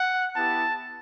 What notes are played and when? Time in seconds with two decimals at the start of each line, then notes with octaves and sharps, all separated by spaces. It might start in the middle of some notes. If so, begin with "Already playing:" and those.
Already playing: F#5
0.35 B3 E4 G4 A5